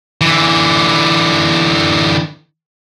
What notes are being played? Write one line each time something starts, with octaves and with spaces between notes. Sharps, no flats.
D3 E3